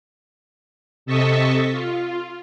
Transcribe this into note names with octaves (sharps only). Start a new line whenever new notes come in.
C3 A4 D#5 A5 C#6 B6
F4